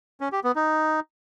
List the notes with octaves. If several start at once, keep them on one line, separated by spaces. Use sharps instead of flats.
C#4
G4
B3
D#4